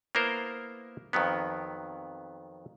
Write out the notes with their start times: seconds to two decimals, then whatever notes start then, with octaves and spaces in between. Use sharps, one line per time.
0.15 A#3 B3 E4 A#4 C5
1.13 F2 D#3 F#3 B3